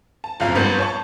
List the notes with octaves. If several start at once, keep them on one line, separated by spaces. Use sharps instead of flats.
A5
F#1 F2 F5 A#5
A#1 G2 B3 A#4 B4 G6
C#5 A5 C#6